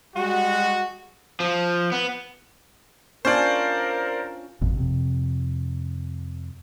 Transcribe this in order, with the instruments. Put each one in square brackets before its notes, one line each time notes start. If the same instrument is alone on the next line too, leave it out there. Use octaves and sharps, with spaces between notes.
[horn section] G3 G#3 F#4
[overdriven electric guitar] F3
B3
[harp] C#4 D4 F4 [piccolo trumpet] A#4 [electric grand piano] C5 D5
[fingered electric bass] G#1 F2 B2
F2 C3